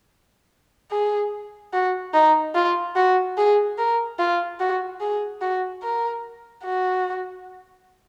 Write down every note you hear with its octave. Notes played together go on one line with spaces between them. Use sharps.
G#4
F#4
D#4
F4
F#4
G#4
A#4
F4
F#4
G#4
F#4
A#4
F#4